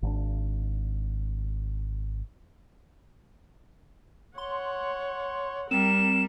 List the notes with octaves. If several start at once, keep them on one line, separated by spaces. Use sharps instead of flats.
G#1 D4
C#5 F#5 C6
G3 C4 A#4 E7